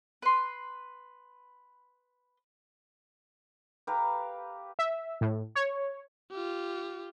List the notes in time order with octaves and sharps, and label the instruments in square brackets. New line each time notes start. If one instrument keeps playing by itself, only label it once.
[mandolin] B4 C6
[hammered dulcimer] G4 B4 F5 A#5
[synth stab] E5
A2
C#5
[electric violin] F4 G4